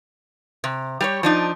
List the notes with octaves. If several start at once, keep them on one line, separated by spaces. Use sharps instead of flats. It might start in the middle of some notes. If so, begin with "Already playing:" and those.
C3
G3 G4 C#5
F3 D4 D#4